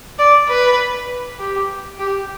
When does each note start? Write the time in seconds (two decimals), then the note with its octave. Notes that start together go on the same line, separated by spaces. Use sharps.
0.19 D5
0.48 B4
1.39 G4
1.99 G4